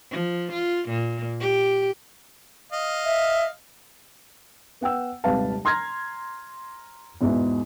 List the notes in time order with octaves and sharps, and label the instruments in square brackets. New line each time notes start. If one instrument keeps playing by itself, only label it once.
[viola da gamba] F3
F4
A#2
G4
[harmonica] D#5 F5
[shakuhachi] E5
[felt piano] B3 F#5 G5 E6
D#1 G#1 C3 B4 F5 A5
A#5 C6 F6 G#6 A#6
E2 G#2 B2 E4